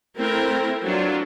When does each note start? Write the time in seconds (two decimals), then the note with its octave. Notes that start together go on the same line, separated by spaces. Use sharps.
0.18 A3 C4 E4 A#4
0.83 F#3 D4 F4